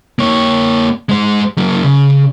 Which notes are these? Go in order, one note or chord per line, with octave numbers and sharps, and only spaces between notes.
A#3 C#5
G#3 C5
F#3 A#3
C#3